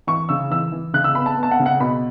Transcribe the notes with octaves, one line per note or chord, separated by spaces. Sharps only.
E3 C#6
C#3 E6
E3 E6
E3
C#3 F#6
E6
B3 B5
A5
B3
A5
F#5
C#3
F#5
B2 B5